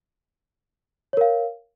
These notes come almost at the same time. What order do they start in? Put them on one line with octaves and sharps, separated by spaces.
C#5 A#4 F5